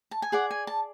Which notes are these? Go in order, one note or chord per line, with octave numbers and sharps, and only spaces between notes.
A5
G#5
G#4 D5 F#5
G#5
A5